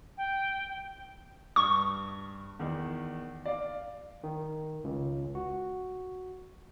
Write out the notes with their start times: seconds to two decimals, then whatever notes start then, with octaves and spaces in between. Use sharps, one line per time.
0.17 G5
1.56 G2 C#6
2.59 E2 D#3
3.46 D5 F5
4.24 D#3
4.84 C#2
5.35 F#4